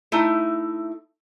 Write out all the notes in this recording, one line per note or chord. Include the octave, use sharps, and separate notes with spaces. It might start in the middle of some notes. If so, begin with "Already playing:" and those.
A3 D#4 E4